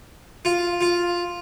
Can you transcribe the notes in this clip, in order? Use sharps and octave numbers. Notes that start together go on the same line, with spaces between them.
F4
F4